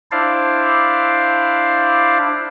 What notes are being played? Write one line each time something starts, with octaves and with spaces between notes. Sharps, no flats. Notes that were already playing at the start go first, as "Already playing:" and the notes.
D4 E4 C5 D5 F5